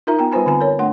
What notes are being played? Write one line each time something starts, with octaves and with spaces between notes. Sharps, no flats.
D#4 F4 A#4 E5 A#5
B3 G5 A#5
G3 F4 B4 C5 G#5 B5
D3 C4 G#5 A#5
A#4 C#5
A3 D4 F#5 C6